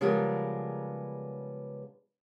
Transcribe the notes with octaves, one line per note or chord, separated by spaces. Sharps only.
C#3 F3 G3 G#3 B3 A#4